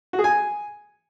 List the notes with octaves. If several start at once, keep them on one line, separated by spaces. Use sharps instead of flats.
F#4
G#4
G#5